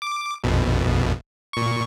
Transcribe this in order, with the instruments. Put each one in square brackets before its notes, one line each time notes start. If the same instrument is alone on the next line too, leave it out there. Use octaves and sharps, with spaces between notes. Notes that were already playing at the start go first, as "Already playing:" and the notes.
[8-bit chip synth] D6
A#1 F2 B2
A#2 C#6